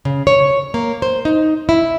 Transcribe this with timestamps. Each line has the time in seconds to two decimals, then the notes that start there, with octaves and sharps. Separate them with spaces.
0.05 C#3
0.27 C#5
0.74 A#3
1.02 C5
1.25 D#4
1.69 E4